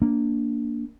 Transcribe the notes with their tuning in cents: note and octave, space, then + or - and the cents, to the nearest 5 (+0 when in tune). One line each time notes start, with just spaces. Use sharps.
A#3 +0 D4 -15